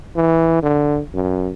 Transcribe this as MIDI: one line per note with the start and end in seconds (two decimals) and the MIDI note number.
0.16 0.60 52
0.63 1.00 50
1.14 1.51 42